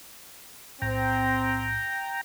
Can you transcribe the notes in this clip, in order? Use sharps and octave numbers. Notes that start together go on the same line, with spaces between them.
B1 A2 C4 G5 A#5